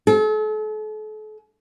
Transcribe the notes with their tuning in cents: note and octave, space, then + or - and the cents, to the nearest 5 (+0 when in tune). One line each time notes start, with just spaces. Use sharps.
A4 -40